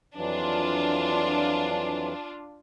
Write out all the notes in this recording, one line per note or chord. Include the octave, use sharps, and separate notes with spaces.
F2 E3 F#3 D4 F4